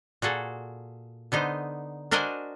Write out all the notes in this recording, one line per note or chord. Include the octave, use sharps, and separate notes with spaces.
A#2 F#4 G#4 A4
D3 B3 D#4 C5
D4 F#4 A#4 C5 D#5 G#5